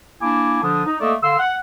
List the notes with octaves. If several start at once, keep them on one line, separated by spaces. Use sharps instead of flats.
A#3 D4 E4 G#5 D6
D3 F3 D4 D#6
D#4
A3 A#3 A4 D5 D#5
D3 F5 C6 E6
F#5